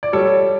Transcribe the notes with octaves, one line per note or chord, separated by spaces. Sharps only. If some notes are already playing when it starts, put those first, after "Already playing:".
D5
G3 A4 C#5